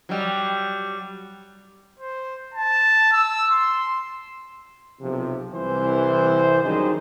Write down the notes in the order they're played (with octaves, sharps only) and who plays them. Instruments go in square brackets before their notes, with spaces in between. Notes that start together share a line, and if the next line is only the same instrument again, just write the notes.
[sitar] F#3 G3
[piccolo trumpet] C5
A5
E6
C6
[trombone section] B1 C3 F3
C2 E3 C5
F#2 D#3 G3 D#4 G#4 C5